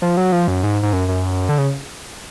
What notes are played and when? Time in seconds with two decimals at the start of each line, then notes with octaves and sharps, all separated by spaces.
0.02 F3
0.17 F#3
0.32 F3
0.48 F#2
0.63 G#2
0.83 G#2
0.93 F#2
1.08 F#2
1.49 D3
1.58 C#3